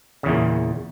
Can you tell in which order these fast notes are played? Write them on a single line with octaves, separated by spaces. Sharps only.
C#3 E2 A#2